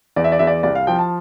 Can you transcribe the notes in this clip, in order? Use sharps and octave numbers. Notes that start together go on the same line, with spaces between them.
E2 D5
E5
D5
E2 E5
D5
C2 D5
F5
F3 G5
A5